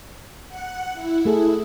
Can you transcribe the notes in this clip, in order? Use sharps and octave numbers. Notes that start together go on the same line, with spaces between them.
F#5
E4
A3 G#4 A4